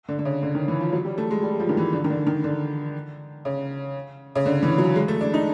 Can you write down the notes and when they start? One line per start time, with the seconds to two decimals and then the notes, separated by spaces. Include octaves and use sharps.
0.09 D3
0.19 D3
0.25 C#3
0.43 D3
0.55 D#3
0.68 E3
0.81 F3
0.92 F#3
1.05 G3
1.18 A3
1.31 G#3
1.43 G3
1.60 F3
1.69 D#3
1.77 E3
1.93 D3
2.04 D#3
2.10 D3
2.27 D#3
2.44 D3
3.45 C#3
4.35 C#3
4.46 D3
4.63 E3
4.78 F#3
4.96 G#3
5.08 A3
5.21 D4
5.34 D#4